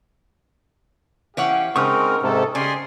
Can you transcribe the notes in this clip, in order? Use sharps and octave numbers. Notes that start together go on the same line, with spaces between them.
E3 C#4 G4 C#5 F5 F#5
C#3 G#3 C4 D#4 A#4 C#6 D#6 F6
G#2 C3 A4
C#3 G4 G#4 D5 G#5 C6